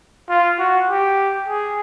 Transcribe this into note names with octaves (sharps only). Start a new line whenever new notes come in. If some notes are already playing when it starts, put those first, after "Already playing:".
F4
F#4
G4
G#4